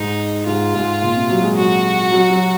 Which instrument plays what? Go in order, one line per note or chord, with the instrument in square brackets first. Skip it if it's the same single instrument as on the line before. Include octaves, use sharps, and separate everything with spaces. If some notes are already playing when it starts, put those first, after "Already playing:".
Already playing: [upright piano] G#2 [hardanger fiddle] D#4
[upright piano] G#2 [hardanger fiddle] F4
[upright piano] G#2
A#2
C3
F#3
G#3
[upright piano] F#3 [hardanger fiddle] F#4
[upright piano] F#3
F#3